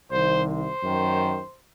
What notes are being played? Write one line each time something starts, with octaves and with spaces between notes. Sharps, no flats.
C2 C3 D#3 C5
C5
F#2 D#3